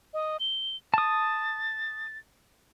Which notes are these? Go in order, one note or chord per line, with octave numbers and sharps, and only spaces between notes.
D#5
G7
A5 D#6 A6